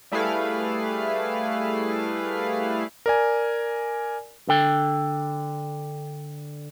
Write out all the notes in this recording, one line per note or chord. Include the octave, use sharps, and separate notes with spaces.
G3 A3 E4 G#4 B4 F5
A#4 D5 G#5
D3 A4 G5